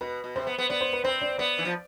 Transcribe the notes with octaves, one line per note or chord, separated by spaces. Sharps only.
B2 B4
B2
C3 C5
B3
B3
B3 D5
C5
B4
C4 C5
D5
B3 D5
E3
F3